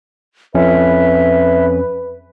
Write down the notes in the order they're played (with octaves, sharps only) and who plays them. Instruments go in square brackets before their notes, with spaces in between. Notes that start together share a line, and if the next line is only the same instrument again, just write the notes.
[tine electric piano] F2 C#4 [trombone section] B4 [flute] E5